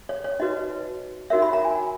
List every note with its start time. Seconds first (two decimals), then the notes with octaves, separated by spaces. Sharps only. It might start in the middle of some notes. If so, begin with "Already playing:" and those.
0.09 C#5
0.24 C#5
0.40 D#4 F#4 B4 D#5
1.30 D#4 F#4 A#4 C#5 E5
1.42 B5
1.53 A#5
1.65 G#5